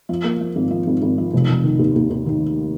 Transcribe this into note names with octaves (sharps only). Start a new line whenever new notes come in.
F3
A#3
F3
G#1
F3
G#1
G#1
F3
F1
F1
D#3
D#2
D#2
D#2
D#3